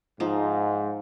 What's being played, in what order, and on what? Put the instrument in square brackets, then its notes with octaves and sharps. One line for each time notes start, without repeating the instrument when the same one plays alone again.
[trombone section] G#2 [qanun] F3 D#4